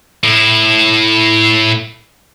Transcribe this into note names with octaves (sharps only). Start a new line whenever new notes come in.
A2 E4